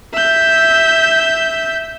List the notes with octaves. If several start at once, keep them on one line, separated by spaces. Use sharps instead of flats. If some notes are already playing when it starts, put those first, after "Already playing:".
E5 G6